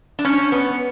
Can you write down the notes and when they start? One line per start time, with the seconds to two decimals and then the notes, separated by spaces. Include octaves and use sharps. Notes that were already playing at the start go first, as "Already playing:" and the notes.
0.19 D4
0.24 G#2 C#4
0.52 B3